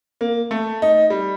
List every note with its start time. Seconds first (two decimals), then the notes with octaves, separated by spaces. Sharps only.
0.21 A#3
0.51 A3
0.82 D#4
1.10 G3